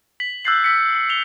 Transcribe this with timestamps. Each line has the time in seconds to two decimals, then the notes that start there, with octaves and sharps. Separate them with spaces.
0.20 B6 F#7
0.45 E6 F#6 G6 A6 C7 F#7
0.64 E6 B6 C#7
0.95 C#7
1.09 C#7 F7 G7